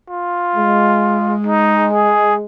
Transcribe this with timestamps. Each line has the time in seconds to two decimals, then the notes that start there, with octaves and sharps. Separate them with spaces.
0.10 F4
0.56 G#3
1.46 D#4
1.93 G#4